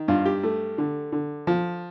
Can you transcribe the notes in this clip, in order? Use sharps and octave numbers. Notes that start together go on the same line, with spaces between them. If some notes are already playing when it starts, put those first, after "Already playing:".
Already playing: D#3
G2 F4
G4
A3
D3
D3
F3